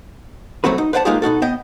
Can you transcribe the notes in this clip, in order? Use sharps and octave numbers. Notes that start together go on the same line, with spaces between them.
C2 F#3 A3 C4 F#4 B4
D#4
B4 C5 D5 F#5 G#5 A5
G#3 A#3 D#4 F4 G4 G#4
B2 D#4 F#4 A4
B3 D#5 G5